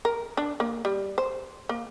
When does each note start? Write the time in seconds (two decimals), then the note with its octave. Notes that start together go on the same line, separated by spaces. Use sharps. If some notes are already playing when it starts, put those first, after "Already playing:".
0.05 A#4
0.37 D4
0.60 A#3
0.85 G3
1.18 C5
1.69 A#3